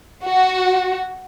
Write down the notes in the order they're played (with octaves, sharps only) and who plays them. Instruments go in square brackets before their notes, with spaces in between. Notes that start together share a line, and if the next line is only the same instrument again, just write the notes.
[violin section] F#4